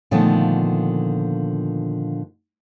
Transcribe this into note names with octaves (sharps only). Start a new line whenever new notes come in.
A#2 D3 D#3 F3 A3 B3